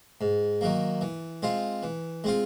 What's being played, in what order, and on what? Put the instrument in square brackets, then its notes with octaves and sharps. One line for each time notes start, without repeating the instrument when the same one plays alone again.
[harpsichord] G#2
D#3 F#3 A#3
E3
G#3 C4 F4
E3
G#3 C4 F4